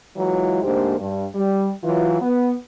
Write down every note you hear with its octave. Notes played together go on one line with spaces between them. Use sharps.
E3 F#3 G#3 E4 F4
D2 G#2 A#3 D4 G4 C5
G2
G3
E3 F#3 F4
B3